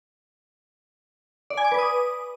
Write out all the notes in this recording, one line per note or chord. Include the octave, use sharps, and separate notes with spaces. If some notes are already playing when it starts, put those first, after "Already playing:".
D5
G#5
D6
B4
D#6